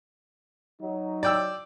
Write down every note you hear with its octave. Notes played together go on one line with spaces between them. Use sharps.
F#3 D#4
D5 G5 E6